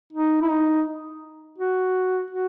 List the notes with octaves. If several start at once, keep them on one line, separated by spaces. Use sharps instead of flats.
D#4
E4
D#4
F#4
F#4